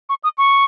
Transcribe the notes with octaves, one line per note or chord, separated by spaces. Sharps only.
C#6
D#6
C#6